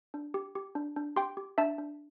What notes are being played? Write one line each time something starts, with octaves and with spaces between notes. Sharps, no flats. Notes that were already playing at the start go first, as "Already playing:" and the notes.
D4
G4
G4
D4
D4
G4 G5 C6
G4
D4 E5 A5
D4